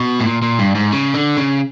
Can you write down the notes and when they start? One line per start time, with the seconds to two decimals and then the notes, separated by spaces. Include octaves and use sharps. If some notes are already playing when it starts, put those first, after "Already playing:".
Already playing: B2
0.20 A2
0.26 A#2
0.42 A#2
0.59 G2
0.75 G#2
0.92 C#3
1.14 D3
1.37 C#3